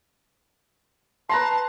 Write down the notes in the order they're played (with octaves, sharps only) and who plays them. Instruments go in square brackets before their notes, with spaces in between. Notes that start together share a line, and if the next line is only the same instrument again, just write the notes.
[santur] B4 A#5 C6 [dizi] A5